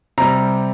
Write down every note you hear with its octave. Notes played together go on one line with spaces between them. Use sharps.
C3 G3 A#5